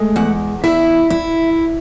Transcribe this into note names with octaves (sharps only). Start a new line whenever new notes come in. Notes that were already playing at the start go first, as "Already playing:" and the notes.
Already playing: G#3 A3
E2 F#5
E4 E5
E4